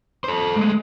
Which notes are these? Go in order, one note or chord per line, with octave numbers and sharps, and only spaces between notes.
A4 C5
G#3 A3